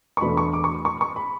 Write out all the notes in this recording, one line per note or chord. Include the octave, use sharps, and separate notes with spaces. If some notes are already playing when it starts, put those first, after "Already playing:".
C#6
E2 B2 A3 D4 B5
C#6
D6
C#6
C#6
C#6
B5